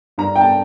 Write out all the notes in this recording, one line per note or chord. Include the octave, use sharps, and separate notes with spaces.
G2 A#5
G5
A5